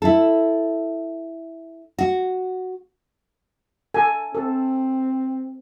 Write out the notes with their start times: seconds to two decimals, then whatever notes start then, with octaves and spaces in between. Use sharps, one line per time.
0.02 E4 A4
1.98 F#4
3.94 A4 G#5
4.35 C4 A4